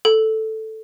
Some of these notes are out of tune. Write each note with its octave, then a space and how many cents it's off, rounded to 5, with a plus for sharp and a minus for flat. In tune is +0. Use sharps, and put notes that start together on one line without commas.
A4 +0